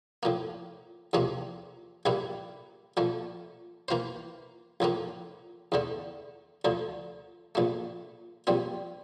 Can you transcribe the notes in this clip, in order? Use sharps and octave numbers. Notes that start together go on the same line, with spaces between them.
A2 F3 A#3
E2 C3 F3 A#3
A#1 A#2 G3 A#3 E4
A#2 F3 A3
E3 A#3 F4 C5
A#1 A2 F3 A#3
E2 D3 A3
D2 D3 F3
A#1 A#2 A3
A#1 A#2 G3 C4